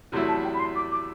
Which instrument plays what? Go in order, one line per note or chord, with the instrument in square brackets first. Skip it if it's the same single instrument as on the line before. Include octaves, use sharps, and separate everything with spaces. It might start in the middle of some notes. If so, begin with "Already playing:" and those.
[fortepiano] E2 C3 F#3 A3 E4
[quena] A5
G5
B5
C6
D6
D6